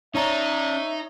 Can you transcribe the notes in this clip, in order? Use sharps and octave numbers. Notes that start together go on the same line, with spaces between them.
C#4 D#4 C#5 D5 E5 A#5